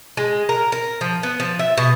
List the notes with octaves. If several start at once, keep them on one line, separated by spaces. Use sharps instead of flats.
G#3
A#4
A#4
F3
B3
F3
E5
B2